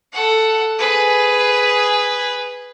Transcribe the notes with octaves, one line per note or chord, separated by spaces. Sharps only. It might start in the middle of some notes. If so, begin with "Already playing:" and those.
A4 F#5
G#4 B4